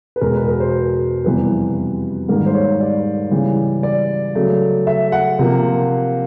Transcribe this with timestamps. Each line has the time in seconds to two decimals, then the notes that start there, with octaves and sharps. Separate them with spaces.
0.16 B4
0.21 E2 B2 G#3 A#4
0.34 B4
0.48 A#4
0.60 C5
1.24 F2 C3 E3 G3 B3 B4
2.28 G#2 D#3 G3 A#3 A#4
2.46 C5
2.54 C#5
2.80 D5
3.31 C#3 E3 G3
3.83 D5
4.35 C#3 F#3 A3
4.87 E5
5.12 F#5
5.39 C3 F3 A#3